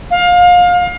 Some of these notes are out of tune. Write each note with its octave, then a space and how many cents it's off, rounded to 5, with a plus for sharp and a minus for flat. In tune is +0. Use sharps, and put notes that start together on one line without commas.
F5 +25